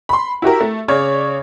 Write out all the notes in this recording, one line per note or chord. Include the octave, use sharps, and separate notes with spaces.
B5 C6
E4 F#4 G4 A#4
A3
C#3 C#5 D5 G#6